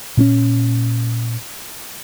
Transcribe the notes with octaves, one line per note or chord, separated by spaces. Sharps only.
A#2 C4 C#4